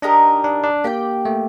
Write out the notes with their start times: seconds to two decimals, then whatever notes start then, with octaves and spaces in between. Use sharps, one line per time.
0.02 D4 D#4 G4 A#4 D#5
0.44 D4
0.64 D4
0.84 A#3 G4 D5 G5
1.25 A3